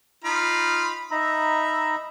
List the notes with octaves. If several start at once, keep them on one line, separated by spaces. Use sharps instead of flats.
D#4 F4 B5
D#4 E5 A#5 B5